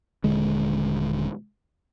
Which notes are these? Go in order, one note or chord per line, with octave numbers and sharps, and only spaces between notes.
D#1 D3 G#3